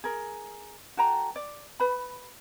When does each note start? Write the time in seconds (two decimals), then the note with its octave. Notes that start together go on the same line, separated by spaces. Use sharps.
0.04 G#4 A#4
0.97 F#4 A4 G5 A#5
1.36 D5
1.80 B4 B5